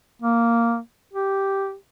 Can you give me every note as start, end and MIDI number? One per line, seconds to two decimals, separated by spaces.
0.22 0.78 58
1.13 1.74 67